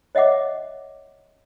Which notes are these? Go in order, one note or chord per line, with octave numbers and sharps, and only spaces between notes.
C#5 D#5 E5 F#5 D6